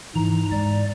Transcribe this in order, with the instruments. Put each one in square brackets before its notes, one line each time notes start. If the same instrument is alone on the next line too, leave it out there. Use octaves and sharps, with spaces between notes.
[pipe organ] G#2 A#5 [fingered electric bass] E3
[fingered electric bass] G#2 [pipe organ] D5